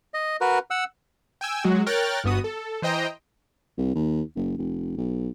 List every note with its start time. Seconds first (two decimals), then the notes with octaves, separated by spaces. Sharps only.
0.14 D#5
0.41 F#4 A#4 B4
0.71 F#5 E6
1.41 G5 G#5 E6
1.64 F#3 G#3 F#4
1.86 A#4 C#5 G5 F6 F#6 A6
2.24 G1 G2 B3 F#4 D#6
2.44 A4
2.82 E3 C5 D#5 G5 A#5
3.78 C2
3.95 D#2
4.36 F#1
4.58 F1
4.97 B1